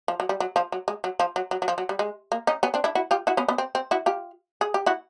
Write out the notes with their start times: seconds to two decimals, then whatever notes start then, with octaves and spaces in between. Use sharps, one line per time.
0.08 F3
0.20 F#3
0.29 G3
0.40 F#3
0.56 F3
0.72 F#3
0.88 G#3
1.04 F#3
1.20 F3
1.36 F#3
1.51 F#3
1.62 F#3
1.68 F3
1.78 F#3
1.89 G3
1.99 G#3
2.32 A#3
2.47 C#4 D#4
2.63 B3 C#4
2.74 C4 D4
2.84 D4 E4
2.95 E4 F#4
3.11 F4 G4
3.27 E4 F#4
3.37 B3 C#4
3.48 B3 C#4
3.58 C4
3.75 C4
3.91 E4 F#4
4.06 F4 G4
4.61 G#4
4.74 G4
4.86 E4 F#4